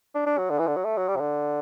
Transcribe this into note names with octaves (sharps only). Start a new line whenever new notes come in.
D4
D4
F#3
D3
E3
D3
F#3
A3
F#3
G3
C3
D3